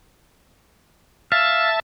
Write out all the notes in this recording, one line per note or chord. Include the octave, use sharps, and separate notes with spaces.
E5 F5 A5